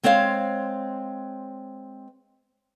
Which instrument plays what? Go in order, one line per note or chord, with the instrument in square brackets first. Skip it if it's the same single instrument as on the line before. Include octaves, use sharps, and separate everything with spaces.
[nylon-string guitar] G#3 C4 C5 C#5 F5